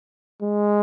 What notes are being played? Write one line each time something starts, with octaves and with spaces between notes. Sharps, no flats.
G#3